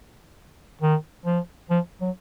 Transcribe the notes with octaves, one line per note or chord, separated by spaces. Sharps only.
D#3
F3
F3
F#3